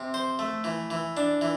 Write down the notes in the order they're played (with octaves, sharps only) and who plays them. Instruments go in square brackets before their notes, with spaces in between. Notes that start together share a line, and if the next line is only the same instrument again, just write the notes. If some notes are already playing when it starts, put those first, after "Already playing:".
Already playing: [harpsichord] C3
C5
A3
E3
E3
D4
E3